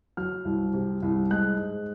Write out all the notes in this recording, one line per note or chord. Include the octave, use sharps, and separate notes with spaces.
F#3 F6
C2
C3
C2
G#3 F#6
G#2